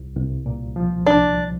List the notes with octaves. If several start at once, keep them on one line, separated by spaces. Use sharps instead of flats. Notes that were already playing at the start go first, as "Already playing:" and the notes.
Already playing: C2
C2
A#2
F3
C2 D4